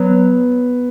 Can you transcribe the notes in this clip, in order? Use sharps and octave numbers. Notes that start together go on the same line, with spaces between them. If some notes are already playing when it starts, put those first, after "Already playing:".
Already playing: F#3 B3